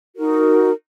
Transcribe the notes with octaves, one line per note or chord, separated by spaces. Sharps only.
D#4 F#4 A#4